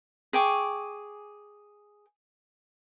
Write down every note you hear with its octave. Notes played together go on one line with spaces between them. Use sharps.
G#4 G5 C#6 D6